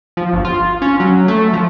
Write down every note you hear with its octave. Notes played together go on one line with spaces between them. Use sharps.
F3
G1
F4
C#4
F#3
A3
F3